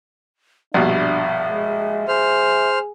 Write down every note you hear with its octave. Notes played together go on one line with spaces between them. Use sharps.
A#1 G2 B2 D4 E5
G#3
G#4 C5 F6